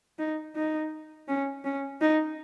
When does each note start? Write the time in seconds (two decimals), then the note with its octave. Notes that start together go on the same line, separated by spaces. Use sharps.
0.19 D#4
0.55 D#4
1.28 C#4
1.65 C#4
2.01 D#4